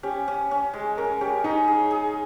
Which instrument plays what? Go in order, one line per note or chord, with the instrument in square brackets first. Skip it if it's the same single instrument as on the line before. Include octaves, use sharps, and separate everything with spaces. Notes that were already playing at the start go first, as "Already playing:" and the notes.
[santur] C#4 [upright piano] G4
[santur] C#4
C#4
G#3
[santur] C#4 [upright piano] A#4
[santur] C#4 [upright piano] G4
[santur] C#4 [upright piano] D#4
[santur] G#4
G#4